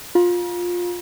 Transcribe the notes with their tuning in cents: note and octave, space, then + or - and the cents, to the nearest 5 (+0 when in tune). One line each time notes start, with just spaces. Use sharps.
F4 +15 A#5 +45